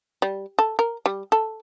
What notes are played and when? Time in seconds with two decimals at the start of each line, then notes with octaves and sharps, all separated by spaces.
0.22 G3
0.59 A4
0.79 A#4
1.06 G3
1.32 A4